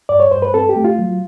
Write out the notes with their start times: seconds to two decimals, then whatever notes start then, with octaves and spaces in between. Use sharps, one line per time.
0.09 G2 D5
0.20 C#5
0.31 G2 C5
0.42 B4
0.54 C4 A4
0.69 G4
0.76 A3
0.84 F4
0.99 F#3